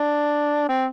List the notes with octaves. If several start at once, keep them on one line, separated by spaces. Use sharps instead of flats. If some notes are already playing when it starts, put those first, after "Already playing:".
Already playing: D4
C4